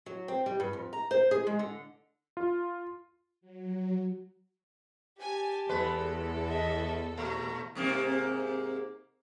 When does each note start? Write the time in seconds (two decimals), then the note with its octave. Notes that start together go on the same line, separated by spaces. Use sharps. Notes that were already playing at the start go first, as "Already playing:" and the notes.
0.06 F#3
0.28 C4
0.46 G3
0.60 G2
0.73 F2
0.93 A#5
1.11 C5
1.31 G#4
1.47 G#3
1.59 D3
2.37 F4
3.41 F#3
5.20 G4 G#5 A5
5.69 E2 G#3 A4 B4
6.49 D#5 E5
7.17 A#2 A3 A#5
7.75 G#2 C3 A#3